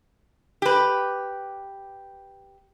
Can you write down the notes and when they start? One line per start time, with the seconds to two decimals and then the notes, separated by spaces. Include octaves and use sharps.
0.62 G4 B4